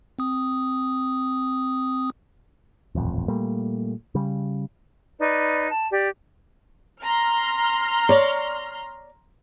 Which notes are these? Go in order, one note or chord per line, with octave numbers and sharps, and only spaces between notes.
C4 D#6
D#1 A1 F2
A#2 G3 A3 A#3
C#3 G3
D#4 B4 D5
A5
G4 D5
A#5 C6 F6
C#5 D5